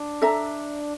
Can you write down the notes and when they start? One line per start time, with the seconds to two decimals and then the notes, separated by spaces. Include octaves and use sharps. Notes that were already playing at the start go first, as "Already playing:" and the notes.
Already playing: D4
0.22 A4 E5 A#5